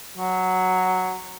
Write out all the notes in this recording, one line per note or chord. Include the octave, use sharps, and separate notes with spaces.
F#3